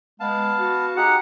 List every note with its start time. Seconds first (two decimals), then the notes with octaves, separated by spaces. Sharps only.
0.20 G#3 B3 F5 A5
0.58 F#4
0.97 D#4 G4 G#4 F#5